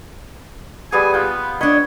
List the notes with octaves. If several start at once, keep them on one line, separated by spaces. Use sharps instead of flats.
G3 B3 G#4 G#5
B3 F4 G5
D4 C#5 D#5 B5